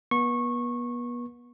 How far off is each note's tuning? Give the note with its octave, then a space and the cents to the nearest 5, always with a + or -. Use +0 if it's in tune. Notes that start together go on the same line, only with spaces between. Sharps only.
B3 -35 C#6 -20